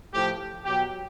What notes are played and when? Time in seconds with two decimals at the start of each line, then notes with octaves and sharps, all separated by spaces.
0.13 A2 F3 G4
0.65 B2 F#3 G4